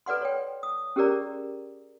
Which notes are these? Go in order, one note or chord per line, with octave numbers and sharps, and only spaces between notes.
A4 B4 D5 F#5 C6
C#5 G5
D#6
C#4 G4 G#4 A#4 D5 A#5